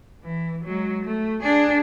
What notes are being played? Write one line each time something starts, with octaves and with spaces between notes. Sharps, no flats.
E3
F#3 G#3
A3
D4 G#4